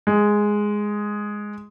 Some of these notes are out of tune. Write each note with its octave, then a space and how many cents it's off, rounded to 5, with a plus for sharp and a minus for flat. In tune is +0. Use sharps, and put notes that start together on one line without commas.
G#3 +0